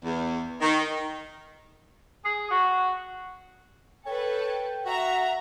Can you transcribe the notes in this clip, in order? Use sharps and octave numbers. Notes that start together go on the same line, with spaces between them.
E2
D#3
G#4
F#4
A4 B4 C#5 G5
F#4 E5 F#5 A#5